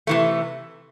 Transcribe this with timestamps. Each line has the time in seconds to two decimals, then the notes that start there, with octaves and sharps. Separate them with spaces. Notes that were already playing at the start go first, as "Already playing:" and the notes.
0.07 C3 E3 A3